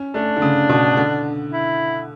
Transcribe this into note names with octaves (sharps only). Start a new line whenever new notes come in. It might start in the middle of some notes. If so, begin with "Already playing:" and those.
Already playing: C#4
A3 D4
D3
C#3
B2
D3
E4